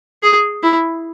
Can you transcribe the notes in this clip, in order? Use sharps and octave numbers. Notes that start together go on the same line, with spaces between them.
G#4
E4